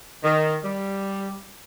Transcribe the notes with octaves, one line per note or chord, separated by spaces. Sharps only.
D#3
G3